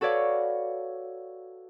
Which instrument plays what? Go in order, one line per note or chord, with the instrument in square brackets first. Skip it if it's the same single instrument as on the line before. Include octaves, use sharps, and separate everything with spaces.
[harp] F#4 A4 B4 C#5 D5 F5